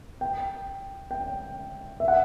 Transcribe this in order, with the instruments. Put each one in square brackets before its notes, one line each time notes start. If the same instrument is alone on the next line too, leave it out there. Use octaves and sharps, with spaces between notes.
[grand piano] G5
G5
E5
F#5